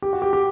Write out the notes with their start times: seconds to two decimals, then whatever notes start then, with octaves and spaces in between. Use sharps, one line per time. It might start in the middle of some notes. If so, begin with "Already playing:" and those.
0.02 G4
0.13 F#4
0.22 G4
0.33 G4